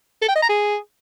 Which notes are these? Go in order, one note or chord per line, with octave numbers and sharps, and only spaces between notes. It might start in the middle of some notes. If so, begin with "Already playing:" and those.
A4
G5
D#5
A#5
G#4